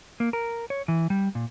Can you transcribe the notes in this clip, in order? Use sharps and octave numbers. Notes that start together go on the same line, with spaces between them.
A#3
A#4
C#5
E3
G3
A#2